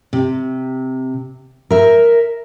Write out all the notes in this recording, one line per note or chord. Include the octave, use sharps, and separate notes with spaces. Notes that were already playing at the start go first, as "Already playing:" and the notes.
C3
A#4 E5